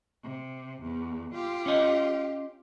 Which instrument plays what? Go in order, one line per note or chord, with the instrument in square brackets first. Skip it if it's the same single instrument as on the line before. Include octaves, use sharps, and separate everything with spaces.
[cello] C3
E2
F4 G4
[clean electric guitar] C#4 D#5